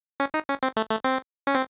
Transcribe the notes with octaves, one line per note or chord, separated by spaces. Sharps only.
C#4
D#4
C#4
C4
A3
A3
C4
C#4
C4